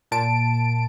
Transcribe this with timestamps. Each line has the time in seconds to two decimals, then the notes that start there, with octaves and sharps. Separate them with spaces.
0.11 A#2 A5 D7